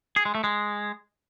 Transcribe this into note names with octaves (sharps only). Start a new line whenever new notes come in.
G#4
G#3
A3
G#3